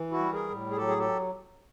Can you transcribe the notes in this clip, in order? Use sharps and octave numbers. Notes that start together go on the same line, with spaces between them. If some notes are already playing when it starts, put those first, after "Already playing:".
Already playing: E3
E4 F#4
G3
G#4 A#4
A2
G#4
F#3 G4 A4
G#4
G4 A4